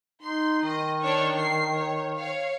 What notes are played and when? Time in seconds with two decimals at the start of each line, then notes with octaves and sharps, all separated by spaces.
0.22 D#4 C6
0.64 D#3 D#5
1.01 D4 C#5 C#6
1.34 C7
1.72 C#5
2.16 C#5 F5